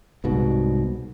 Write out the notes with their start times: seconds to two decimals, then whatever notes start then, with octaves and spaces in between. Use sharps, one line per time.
0.24 C2 G#2 B2